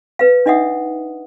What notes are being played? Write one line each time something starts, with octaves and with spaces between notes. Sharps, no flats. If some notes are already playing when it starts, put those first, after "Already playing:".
B4 F5
D4 D#4 D#5 E5 F#5 D#6